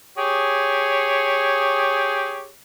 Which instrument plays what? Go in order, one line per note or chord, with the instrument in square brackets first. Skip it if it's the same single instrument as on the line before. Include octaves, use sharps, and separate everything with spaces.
[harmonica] G4 G#4 C#5